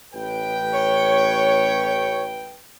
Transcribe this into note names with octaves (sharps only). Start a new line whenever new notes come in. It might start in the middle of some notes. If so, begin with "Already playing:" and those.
A1 B4 G5
C#5